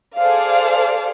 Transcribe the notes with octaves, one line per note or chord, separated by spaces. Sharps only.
G#4 A4 C5 D5 F5